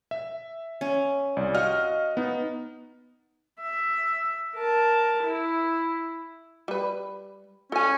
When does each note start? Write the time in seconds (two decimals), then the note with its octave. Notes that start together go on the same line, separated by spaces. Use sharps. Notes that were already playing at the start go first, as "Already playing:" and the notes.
0.11 E5
0.81 C#4
1.37 C2 D5
1.54 F#4 D#5 F5 F6
2.17 B3 D#4
3.61 E5
4.56 A#4 A5
5.24 E4
6.68 G3 B4
7.72 C#4 A4 G#5